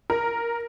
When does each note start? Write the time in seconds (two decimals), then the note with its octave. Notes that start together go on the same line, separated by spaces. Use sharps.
0.10 A#4